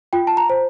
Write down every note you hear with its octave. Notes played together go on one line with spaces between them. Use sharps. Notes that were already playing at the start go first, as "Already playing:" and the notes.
F4 G5
A5
A#5
C5